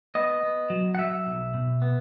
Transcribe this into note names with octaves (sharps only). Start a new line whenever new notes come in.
B3 D#5
B3
F#3
F#5
F#3 E5
B1
B2
B3